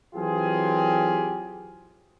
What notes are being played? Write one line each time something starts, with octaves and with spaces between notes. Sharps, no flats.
E3 F#3 C4 F4 G4 G#4